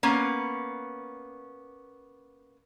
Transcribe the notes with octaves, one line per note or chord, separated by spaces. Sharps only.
A#3 B3 C#4